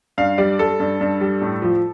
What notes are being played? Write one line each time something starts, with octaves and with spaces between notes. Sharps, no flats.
G2 F5
G3 D5
G3 A4
G2
G2
G3
A2
F3